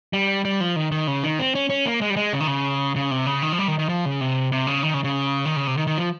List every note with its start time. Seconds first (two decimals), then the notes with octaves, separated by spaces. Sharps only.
0.13 G3
0.45 G3
0.60 F3
0.76 D#3
0.92 D#3
1.07 C#3
1.24 D#3
1.39 C4
1.55 C#4
1.70 C#4
1.86 A#3
2.01 G#3
2.10 G3
2.16 G#3
2.33 C#3
2.40 D#3
2.48 C#3
2.96 C#3
3.11 C3
3.26 C#3
3.42 D#3
3.52 F3
3.59 G3
3.68 D#3
3.79 D#3
3.89 F3
4.05 C#3
4.21 C3
4.52 C3
4.67 C#3
4.83 D#3
4.94 C#3
5.04 C#3
5.45 D#3
5.56 C#3
5.67 C3
5.77 D#3
5.87 D#3
5.98 F3